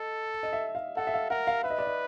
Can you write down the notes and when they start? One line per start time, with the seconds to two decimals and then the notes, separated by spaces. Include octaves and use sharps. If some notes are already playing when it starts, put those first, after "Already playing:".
Already playing: A4 D#5
0.43 D#5
0.53 E5
0.75 F5
0.97 A4 F#5
1.07 E5
1.14 F5
1.30 A#4 F#5
1.47 F5
1.64 B4 E5
1.70 D#5
1.78 D5
1.86 D#5